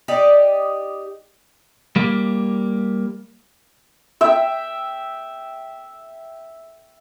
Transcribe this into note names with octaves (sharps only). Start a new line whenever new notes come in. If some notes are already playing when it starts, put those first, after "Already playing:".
D#4 G4 D5 D#5
G3 A#3
E5 G5